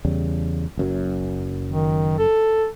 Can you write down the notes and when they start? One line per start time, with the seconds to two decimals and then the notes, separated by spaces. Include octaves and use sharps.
0.05 E2 C#3 G3
0.77 F#1 F#2 F#3
1.69 D#3
2.18 A4